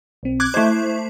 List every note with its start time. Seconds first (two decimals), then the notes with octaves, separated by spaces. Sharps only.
0.23 B1 C4
0.40 D6 F#6 G#6
0.54 A3 E4 C5 D#5